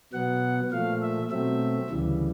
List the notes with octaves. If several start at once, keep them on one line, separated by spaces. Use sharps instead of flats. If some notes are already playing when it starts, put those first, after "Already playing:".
B2 F#3 B3 F#5
A#2 F3 A3 F5
E5
B2 F#3 A3 C4 E5
D2 C#3 E3 G3